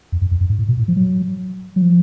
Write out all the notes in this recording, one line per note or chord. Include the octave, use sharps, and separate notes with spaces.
F2
F#2
F2
F#2
G#2
A2
B2
A2
F3
F#3
F#3
F3